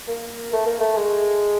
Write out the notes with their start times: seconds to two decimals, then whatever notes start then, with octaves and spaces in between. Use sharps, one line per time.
0.08 A#3
0.53 A3
0.66 A#3
0.80 A3
0.97 G#3